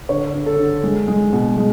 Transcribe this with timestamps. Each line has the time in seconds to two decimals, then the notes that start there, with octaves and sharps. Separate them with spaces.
0.09 D3 C#5
0.34 D3
0.46 A4
0.58 D3
0.83 G#3
1.08 G#3
1.33 B2
1.57 G#3